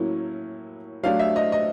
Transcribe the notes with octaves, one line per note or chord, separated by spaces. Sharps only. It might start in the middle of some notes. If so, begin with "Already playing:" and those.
Already playing: A2 F#3 A#3 C#4 E4
F#3 A3 D4 F5
E5
D#5
D#5